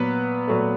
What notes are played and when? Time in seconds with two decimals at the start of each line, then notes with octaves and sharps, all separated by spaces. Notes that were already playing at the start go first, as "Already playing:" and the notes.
Already playing: A#2 F#3 B3 B4
0.47 A#2 F#3 A3